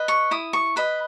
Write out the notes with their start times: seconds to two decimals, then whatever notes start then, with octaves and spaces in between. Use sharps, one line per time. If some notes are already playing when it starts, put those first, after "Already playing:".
Already playing: B4 D#5
0.08 C#6
0.31 E4 D#6
0.53 C#6
0.76 B4 D#5 B5